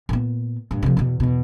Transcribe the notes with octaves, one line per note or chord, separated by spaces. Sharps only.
A#2 B3
G2 A#2
C3 F3
E2 B2
E2 B2